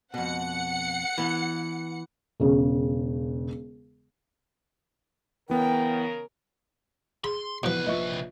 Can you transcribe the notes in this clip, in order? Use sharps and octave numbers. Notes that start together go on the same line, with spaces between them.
F2 B2 F#5 C#7
E3 B3
E1 C#3
C#3 E3 B3 A#4 G5
G#4 B5 C6
C2 B2 E3 F3 B3 E4 B4
A#1 F4 D#5 E5 C#6